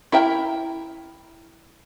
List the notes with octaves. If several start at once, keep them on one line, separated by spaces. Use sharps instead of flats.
E4 A#4 E5 G5